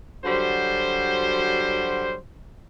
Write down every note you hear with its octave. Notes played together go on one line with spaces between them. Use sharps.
D3 F#3 G3 F#4 C5